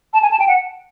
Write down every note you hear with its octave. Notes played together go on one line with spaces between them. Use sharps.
A5
G#5
A5
G5
F#5